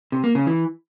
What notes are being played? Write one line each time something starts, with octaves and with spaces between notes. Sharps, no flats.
C3
A#3
C#3
E3